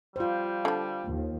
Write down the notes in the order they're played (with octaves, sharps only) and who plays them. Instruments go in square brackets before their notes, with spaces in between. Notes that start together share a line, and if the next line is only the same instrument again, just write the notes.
[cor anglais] G3 [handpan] F4 C5
[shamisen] D3 F3
[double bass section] D#2